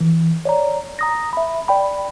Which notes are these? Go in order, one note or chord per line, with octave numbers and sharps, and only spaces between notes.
E3
C#5 D5 A#5
A#5 D#6 A#6
E5 B5
D5 G5 B5